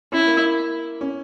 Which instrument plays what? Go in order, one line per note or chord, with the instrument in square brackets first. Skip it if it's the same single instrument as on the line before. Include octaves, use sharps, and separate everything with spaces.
[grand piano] C#4 [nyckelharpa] E4
[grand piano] A#3
C#4